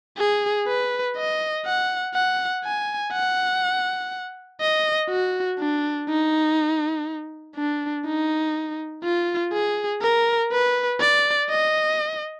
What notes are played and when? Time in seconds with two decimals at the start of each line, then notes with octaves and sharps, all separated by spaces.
0.18 G#4
0.68 B4
1.17 D#5
1.66 F#5
2.14 F#5
2.65 G#5
3.13 F#5
4.61 D#5
5.10 F#4
5.60 D4
6.09 D#4
7.56 D4
8.06 D#4
9.04 F4
9.53 G#4
10.02 A#4
10.52 B4
11.00 D5
11.50 D#5